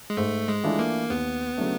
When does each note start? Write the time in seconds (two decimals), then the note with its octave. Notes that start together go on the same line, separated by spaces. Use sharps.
0.10 G#3
0.17 G#2 A3
0.48 G#3
0.64 E3 A3 D4 F4
0.79 A#3
1.10 D#2 B3
1.57 C#3 F#3 A3 D4